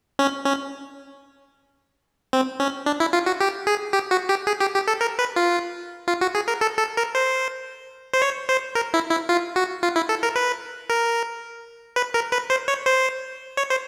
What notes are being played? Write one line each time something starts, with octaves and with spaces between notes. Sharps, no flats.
C#4
C#4
C4
C#4
D4
E4
F4
F#4
G4
G#4
G4
F#4
G4
G#4
G4
G4
A4
A#4
B4
F4
F4
F#4
G#4
A#4
A4
A4
A#4
C5
C5
C#5
C5
A#4
E4
E4
F4
F#4
F4
E4
A4
A#4
B4
A#4
B4
A#4
B4
C5
C#5
C5
C#5
C5